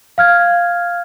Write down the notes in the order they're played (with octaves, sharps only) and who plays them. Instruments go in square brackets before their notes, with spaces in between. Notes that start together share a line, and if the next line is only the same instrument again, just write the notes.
[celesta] F5 F6 G#6